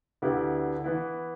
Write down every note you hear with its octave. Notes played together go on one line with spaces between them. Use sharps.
D2 D3 B3 E4 G4
E3 B3 E4